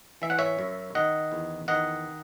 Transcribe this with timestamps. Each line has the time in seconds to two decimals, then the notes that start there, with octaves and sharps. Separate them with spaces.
0.22 E3 E5
0.30 F#5
0.38 C#5 E5
0.59 F#2
0.95 D#3 D#5 F#5
1.32 E2
1.68 D#3 D#5 F#5